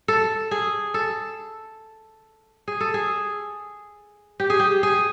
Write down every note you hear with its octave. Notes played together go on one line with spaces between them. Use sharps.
A4
G#4
A4
G#4
A4
G#4
G4
G#4
G4
G#4